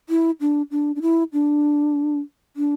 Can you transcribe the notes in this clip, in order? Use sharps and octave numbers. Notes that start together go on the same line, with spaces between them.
E4
D4
D4
D4
E4
D4
D4